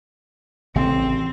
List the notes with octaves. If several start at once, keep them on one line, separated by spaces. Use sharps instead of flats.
A1 C#3 A3 C4